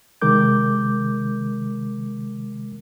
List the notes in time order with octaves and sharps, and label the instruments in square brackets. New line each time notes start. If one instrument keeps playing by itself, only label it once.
[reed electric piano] C3 D#3 G#3 A#4 D6 G6